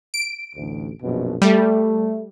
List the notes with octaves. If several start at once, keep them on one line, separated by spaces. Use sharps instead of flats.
D7
A1 D2
A#1 F#2 B2
G3 A3